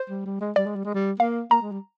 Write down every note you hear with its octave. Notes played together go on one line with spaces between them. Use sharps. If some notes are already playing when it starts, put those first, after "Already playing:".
Already playing: C5
G3
G3
G#3
G3 D5
G#3
G3
G#3
G3
A#3 F5
A#3 A#5
G#3
G3